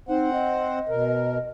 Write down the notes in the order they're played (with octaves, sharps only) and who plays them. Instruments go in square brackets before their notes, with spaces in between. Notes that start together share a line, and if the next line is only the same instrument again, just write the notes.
[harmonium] C4 C5 F#5 [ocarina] D#4
[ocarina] D#5
[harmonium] B2 A#4